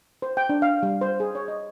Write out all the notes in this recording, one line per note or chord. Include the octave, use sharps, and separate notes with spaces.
C5
G5
D4
F5
G3
C5
G#4
C#5
D#5